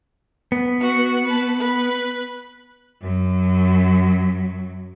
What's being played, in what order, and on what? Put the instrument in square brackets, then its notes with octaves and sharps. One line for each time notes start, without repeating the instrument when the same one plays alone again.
[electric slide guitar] B3
[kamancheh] F#4 F#5
B4 A5
B4
[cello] F#2 F#3